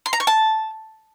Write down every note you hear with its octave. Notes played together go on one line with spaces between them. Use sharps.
C6
A#5
C#6
A5